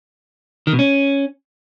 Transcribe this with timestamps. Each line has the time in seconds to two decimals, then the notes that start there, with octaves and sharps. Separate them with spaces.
0.67 D#3
0.73 B2
0.79 C#4